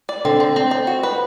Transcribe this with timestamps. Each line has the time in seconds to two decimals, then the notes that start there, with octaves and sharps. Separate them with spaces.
0.09 D5
0.25 D3 C4
0.40 C4
0.56 C4
0.71 C4
0.87 F#4
1.03 B4